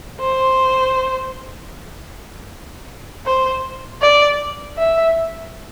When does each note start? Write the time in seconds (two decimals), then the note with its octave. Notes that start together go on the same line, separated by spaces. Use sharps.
0.20 C5
3.26 C5
4.02 D5
4.78 E5